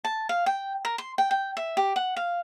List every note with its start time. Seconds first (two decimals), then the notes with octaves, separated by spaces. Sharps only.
0.05 A5
0.29 F5
0.46 G5
0.85 A#4
0.98 C6
1.18 G5
1.31 G5
1.57 E5
1.77 G4
1.96 F#5
2.17 F5